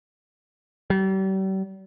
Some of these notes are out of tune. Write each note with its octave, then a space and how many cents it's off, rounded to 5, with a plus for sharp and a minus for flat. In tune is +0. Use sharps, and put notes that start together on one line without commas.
G3 -40